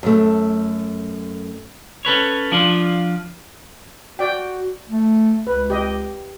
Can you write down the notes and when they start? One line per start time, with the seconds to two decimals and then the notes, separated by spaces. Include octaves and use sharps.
0.03 F#2 A3
2.05 C#4 A4 B4 C#5
2.52 F3 D4 F4
4.19 F#4 D5 G5
4.89 A3
5.47 C#2 B4
5.70 G4 D#5